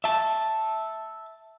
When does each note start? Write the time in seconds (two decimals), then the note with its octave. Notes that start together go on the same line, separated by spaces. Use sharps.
0.04 E5 A5